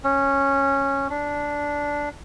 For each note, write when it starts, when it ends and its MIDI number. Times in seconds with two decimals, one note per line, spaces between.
0.04 1.07 61
1.10 2.09 62